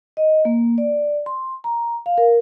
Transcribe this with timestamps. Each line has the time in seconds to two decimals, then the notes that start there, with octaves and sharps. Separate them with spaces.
0.17 D#5
0.45 A#3
0.78 D5
1.26 C6
1.64 A#5
2.06 F5
2.18 A#4